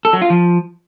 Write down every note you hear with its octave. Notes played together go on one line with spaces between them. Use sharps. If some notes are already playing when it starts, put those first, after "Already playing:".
A4
F#3
F4
F3